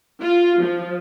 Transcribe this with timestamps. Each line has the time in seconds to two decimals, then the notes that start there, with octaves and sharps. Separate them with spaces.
0.22 F4
0.62 F3